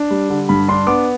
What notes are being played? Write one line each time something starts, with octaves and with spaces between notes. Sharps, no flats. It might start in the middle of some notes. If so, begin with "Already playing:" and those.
Already playing: D4
G3
D3
G2 B5
D4 C6
B3 D6